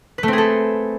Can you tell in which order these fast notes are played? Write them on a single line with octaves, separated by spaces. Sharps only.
B4 A3 C4 G#4 A4